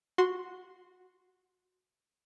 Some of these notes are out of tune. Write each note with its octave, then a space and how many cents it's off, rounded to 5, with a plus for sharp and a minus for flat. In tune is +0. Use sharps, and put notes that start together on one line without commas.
F#4 -10 C6 +0